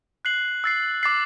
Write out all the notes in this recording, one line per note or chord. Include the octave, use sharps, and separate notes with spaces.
F#6 C7 F#7
E6 A6 C7
D6 A6 C7